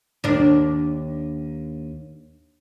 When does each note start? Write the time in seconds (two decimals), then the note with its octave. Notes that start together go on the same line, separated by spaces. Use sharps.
0.24 D#2 D4